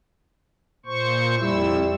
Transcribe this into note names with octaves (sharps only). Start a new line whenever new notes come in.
A#2 C5 C#6
F2 G3 E4 E6